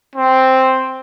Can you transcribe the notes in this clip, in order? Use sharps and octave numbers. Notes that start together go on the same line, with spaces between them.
C4